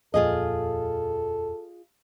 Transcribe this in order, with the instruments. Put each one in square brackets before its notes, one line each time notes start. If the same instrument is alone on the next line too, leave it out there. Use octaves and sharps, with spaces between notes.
[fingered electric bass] D#1 F2 A#2 [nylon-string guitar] F4 G#4 D#5 [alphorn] A4